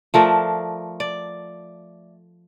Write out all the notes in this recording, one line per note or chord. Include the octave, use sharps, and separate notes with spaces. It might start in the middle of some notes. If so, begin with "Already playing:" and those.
F3 A3 A#4 D5
D5